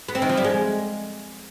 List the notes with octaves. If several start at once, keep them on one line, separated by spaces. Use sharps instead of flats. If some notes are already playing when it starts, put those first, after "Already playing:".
B3
C4
D#3
F3
G3
G#3